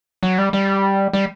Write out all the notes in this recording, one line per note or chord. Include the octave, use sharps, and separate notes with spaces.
F#3
G3
G3
G3